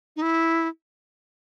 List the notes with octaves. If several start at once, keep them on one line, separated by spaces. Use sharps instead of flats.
D#4
E4